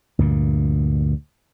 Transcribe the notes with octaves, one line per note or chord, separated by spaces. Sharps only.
D2 G2 A#2